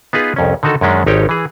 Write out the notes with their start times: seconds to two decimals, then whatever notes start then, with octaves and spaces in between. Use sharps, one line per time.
0.13 B3 D#4 F4 G#4 B4
0.36 C2 F2 C#4
0.63 D3 D#3 D#4 F#4 A4
0.81 F#2 D#3 G#3 C#4 D4
1.06 G#1 D#4 G4 C#5 G5
1.29 E3 G#4